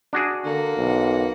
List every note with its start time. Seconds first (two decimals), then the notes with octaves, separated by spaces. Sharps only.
0.13 D4 F#4 G#4
0.45 D3 A#3 F#5
0.77 B1